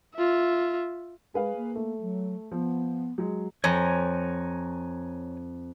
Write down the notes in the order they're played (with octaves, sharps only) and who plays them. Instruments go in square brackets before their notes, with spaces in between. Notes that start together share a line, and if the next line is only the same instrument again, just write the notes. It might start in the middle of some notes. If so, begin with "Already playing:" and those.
[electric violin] F4 E5
[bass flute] G#3 [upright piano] G#4 B4 F5
[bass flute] A#3
[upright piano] A3
[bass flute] F#3
[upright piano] F3 [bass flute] B3
[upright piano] F#3 G#3
[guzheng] F2 [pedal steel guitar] C#5 G#5 A#5